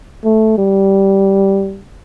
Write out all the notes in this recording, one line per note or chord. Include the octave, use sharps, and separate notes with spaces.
A3
G3